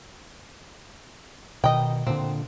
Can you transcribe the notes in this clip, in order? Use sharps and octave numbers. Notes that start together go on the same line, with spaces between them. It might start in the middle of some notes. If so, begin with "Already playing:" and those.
B2 D#3 D#5 G5
A#2 D3 C4